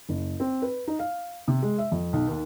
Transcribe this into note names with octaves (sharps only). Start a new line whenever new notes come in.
F#1
C4
B4
D#4
F5
C3
G#3
E5
F2
B1
D#2